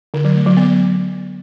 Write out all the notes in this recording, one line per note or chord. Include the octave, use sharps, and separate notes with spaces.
D3
F#3
A3
F#3
B3